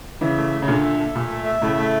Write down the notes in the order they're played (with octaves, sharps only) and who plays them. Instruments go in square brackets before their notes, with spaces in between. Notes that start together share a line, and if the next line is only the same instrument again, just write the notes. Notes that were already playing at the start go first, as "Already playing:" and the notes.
[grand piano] C#3 E3 [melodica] E5
[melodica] A3
A3
[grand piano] C#3
[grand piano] A#2 D3 [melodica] A4
[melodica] E5
A4
[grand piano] A#2 [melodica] A3
[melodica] E5
E5
[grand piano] A2 C#3 [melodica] A3
[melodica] A3